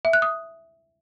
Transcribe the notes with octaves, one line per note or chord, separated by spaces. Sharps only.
E5
F#6
D#6